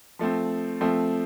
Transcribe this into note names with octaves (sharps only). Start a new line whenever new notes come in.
F3 A3 C4
F3 A3 C4